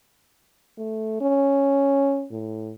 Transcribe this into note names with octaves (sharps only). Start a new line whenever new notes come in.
A3
C#4
A2